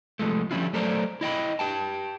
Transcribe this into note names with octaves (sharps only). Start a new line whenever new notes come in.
C2 F3 G#3 A3
D3 F3 G3 C#4 E4 F4
F#3 A3 A4 A#4 C5 D5
E4 D#5 G5 B5
G4 G5 A5